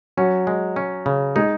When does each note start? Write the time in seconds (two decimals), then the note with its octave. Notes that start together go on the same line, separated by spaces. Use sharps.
0.17 F#3 C#4
0.47 G#3
0.76 C#4
1.06 C#3
1.36 G#3 D#4